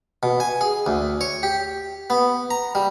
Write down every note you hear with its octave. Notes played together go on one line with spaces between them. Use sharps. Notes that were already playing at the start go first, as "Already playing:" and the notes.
B2
G#5
G#4
D2
C#5
G4
B3
A#5
G3